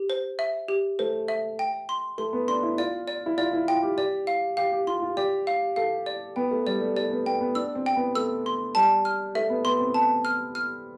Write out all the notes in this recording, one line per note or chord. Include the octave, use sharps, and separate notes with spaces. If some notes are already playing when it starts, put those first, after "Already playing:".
Already playing: G4
C5
E5
G4
A3 C5
E5
G5
C6
A3 C6
B3
D4 C6
E4
F4 D5
D5
E4
F4 D5
E4
F4 G5
G4
G4 D5
F5
G4 F5
G4
F4 C6
F4
G4 D5
F5
A4 F5
D5
B3 G5
A3
G3 D5
A3
A3 D5
B3
B3 G5
B3
D4 E6
C4
G5
B3
A3 E6
C6
G3 A5
F6
A3 E5
B3
B3 C6
C4
A5
F6
F6